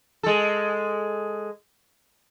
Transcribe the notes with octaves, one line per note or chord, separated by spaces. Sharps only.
G#3 A4